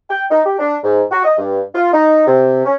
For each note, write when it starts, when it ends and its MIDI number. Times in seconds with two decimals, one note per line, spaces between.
0.10 0.24 79
0.30 0.41 63
0.46 0.55 67
0.59 0.76 62
0.84 1.02 44
1.11 1.22 66
1.24 1.34 75
1.38 1.61 43
1.75 1.91 65
1.93 2.26 63
2.27 2.63 48
2.65 2.75 61